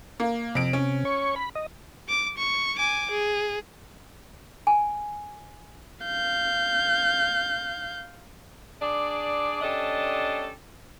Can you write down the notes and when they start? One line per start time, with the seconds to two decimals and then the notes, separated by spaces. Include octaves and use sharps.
0.20 A#3
0.55 F2 C3 D7
0.73 C#4
1.05 C#5 C#6
1.36 B5
1.55 D#5
2.09 D6
2.38 C#6
2.78 G#5 D6
3.11 G#4
4.67 G#5
6.05 F5 G6
8.81 D4 G#4 D5
9.62 C#4 D4 G4 A4 D#5